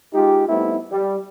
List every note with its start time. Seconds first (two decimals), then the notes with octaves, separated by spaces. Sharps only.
0.14 G#3 D#4 F4 G4
0.48 G3 A3 B3 C4 D#4 E4
0.92 G3